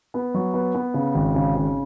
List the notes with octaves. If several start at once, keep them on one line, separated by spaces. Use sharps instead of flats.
B3
F#3
B3
B3
C#3
G#1
C#3
C#3